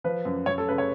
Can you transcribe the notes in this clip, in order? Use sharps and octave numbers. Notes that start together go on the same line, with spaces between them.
F3 B4
F#2
F#2 C#5
A4
C#3 B4
C#5